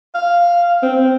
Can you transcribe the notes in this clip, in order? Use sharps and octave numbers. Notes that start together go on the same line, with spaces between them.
F5
C4